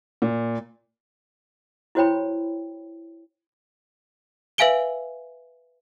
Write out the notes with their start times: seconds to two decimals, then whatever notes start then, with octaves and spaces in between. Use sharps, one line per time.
0.22 A#2
1.95 E4 F#4 C5 C#5 G5 B5
4.58 B4 E5 F5 G#5 D7 G7